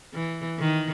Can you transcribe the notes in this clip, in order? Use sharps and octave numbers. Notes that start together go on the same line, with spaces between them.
E3
D#3